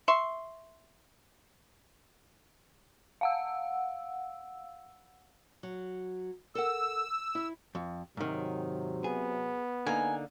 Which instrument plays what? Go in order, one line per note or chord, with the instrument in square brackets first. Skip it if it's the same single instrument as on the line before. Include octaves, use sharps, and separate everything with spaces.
[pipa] E5 C6 C#6
[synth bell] F5 F#5 E6
[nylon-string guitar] F#3
[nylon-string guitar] A4 A#4 F#5 [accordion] E6
[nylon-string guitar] E4
[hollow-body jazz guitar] F2
[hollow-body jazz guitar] G#2 D#3 [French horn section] C3 F#3
[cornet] B3 [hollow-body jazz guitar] G#4
[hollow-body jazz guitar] D3 A#3 D#4 [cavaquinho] G#5